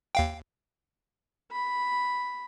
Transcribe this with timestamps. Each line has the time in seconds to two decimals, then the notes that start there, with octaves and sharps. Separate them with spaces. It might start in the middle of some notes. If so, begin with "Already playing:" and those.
0.15 D#2 F5 G5
1.52 B5